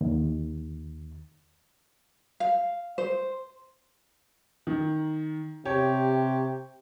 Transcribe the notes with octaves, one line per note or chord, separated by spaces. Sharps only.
D#2
F5
C5
D#3
C3 G4 C#5